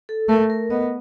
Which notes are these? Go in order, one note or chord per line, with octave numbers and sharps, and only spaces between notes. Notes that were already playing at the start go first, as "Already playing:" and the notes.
A4
A3 A#4
A#4
B3 D#5